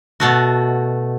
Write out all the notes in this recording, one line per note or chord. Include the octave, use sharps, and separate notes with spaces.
B2 A3 F#4